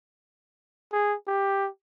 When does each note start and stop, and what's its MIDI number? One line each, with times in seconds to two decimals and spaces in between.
0.93 1.15 68
1.27 1.69 67